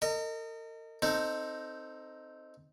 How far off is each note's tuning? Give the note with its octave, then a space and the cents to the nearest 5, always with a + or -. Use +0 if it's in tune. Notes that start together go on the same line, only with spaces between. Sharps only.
A#4 -40 D#5 +0
C4 +0 D#4 +0 A4 +25